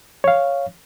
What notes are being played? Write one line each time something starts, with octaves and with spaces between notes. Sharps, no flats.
C#5 F5